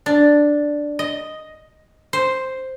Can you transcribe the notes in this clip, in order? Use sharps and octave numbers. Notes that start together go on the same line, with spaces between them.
D4
D#5
C5